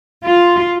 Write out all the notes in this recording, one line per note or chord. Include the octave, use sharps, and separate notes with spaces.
F4